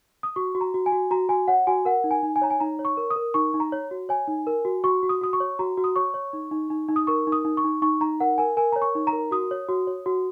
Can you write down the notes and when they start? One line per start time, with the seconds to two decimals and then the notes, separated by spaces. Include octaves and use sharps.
0.23 D#6
0.36 F#4 C#6
0.55 F#4
0.61 A#5
0.74 F#4
0.86 G#5
0.92 F#4
1.11 F#4 A#5
1.29 F#4 G#5
1.48 C#5 F#5
1.67 F#4 G#5
1.85 A#4 F#5
2.04 D#4
2.11 G#5
2.23 D#4
2.36 G#5
2.41 C#5 A#5
2.50 G#5
2.60 D#4 A#5
2.79 C#5
2.85 C#6
2.97 A#4
3.10 D#6
3.16 A#4
3.34 D#4 C#6
3.54 D#4
3.60 A#5
3.72 C#5
3.91 F#4
4.09 C#5 G#5
4.28 D#4
4.47 A#4
4.65 F#4
4.84 F#4 C#6
5.03 F#4
5.09 D#6
5.21 F#4 D#6
5.33 C#6
5.40 C#5
5.59 F#4 A#5
5.77 F#4
5.84 D#6
5.96 C#5 C#6
6.14 C#5
6.33 D#4
6.51 D#4
6.70 D#4
6.89 D#4
6.96 D#6
7.07 A#4 C#6
7.27 D#4
7.32 D#6
7.45 D#4
7.57 C#6
7.64 D#4
7.82 D#4 C#6
8.01 D#4 A#5
8.20 A#4 F#5
8.38 A#4 G#5
8.57 A#4 G#5
8.72 C#5 A#5
8.82 C#6
8.95 D#4
9.07 A#5
9.13 A#4
9.31 F#4 D#6
9.51 C#5
9.69 F#4
9.87 C#5
10.06 F#4